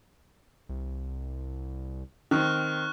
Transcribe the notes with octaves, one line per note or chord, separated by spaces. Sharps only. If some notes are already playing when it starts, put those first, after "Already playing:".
C2
D#3 C4 C#6 F6 F#6